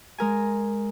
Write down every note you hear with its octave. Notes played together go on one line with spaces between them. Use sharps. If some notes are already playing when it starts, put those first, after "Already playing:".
G#3 A#4 G#5